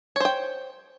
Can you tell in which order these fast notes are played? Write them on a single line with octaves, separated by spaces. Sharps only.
C#5 C5 G5